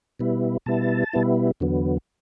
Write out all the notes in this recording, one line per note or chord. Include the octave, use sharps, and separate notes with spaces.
B2 G3 B3 E4
B2 G3 B3 E4 A5
B2 G3 B3 E4
E2 D3 F#3 B3